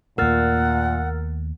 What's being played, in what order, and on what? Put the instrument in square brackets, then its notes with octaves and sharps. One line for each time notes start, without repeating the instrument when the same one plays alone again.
[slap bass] D#2 A3 [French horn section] A#2 [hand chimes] A#4 F6 A6 [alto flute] F#5